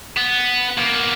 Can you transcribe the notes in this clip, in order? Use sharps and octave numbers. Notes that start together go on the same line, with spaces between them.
B3
A#3 B3